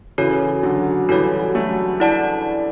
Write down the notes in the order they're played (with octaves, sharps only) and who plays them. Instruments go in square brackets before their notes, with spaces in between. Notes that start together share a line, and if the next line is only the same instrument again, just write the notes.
[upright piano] C#3 E3 [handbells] F#4 A4 C#5
[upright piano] D3 F#3
[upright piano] E3 G3 [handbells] F#4 A4 C#5
[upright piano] F#3 A3
[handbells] E4 A4 D5 F#5 A5